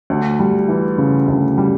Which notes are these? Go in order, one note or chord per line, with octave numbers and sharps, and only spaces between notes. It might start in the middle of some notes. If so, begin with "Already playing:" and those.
D2
G3
E3
C#3
D2
G3